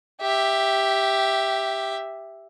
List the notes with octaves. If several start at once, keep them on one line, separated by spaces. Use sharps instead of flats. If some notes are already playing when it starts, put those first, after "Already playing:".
G4 E5